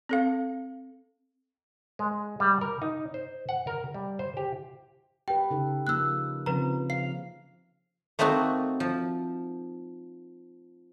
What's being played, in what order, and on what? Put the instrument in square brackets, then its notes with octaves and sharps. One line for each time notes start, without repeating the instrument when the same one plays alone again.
[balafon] C4 A4 F5
[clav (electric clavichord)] G#3
G3
A#4
D#4
C5
F#5
A#4
G3
C5
G4
[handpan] G4 B4 [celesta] G5
[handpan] C#3 D#4 A4
[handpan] F3 A#3 D#4 [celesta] E6 F#6
[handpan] C#3 F3 C4 [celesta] B4 A#5
[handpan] F5 [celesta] C7
[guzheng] A3 A#3 C4 D#4 F#4
F3